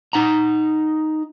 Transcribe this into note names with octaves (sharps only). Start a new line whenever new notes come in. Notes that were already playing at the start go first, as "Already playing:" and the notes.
D#4 F#5 A#5